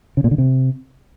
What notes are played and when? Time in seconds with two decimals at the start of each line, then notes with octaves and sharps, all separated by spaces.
0.17 C#3
0.24 A#2
0.31 D3
0.38 C3